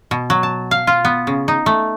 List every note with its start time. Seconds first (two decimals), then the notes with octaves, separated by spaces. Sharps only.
0.11 B2
0.30 F#3
0.43 A5
0.71 F5
0.87 F4
1.05 B3
1.27 C#3
1.48 D#4
1.66 A3